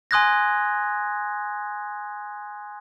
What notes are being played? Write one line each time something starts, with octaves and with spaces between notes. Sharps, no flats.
G#5 C6 D#6 F#6 G#6 A#6